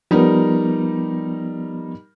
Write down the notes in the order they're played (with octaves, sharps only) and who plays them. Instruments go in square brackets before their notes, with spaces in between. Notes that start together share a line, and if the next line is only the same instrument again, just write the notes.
[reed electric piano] F3 B3 [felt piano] G3 D#4 A#4